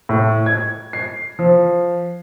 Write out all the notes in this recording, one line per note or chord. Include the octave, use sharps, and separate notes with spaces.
A2
G#6
C7
F3